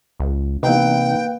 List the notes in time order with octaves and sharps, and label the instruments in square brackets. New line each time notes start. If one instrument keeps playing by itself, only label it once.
[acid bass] C#2
[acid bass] C3 [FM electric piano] E3 B3 D#4 [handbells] A#3 B4 [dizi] G5